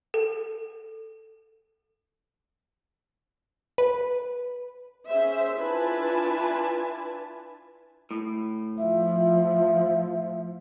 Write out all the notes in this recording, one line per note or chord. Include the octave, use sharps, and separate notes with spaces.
A4
B4
C#4 G#4 C5 E5
D4 E4 F4 B4 G#5 A5
A2
F3 E5